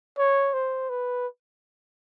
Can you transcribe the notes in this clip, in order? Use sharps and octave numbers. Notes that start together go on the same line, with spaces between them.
C#5
C5
B4